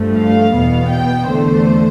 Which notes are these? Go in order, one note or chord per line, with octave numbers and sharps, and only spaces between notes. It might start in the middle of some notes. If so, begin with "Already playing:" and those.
Already playing: G2 F3 A3
F5
E2 B2 B3
G5
E2 D3 A3 C5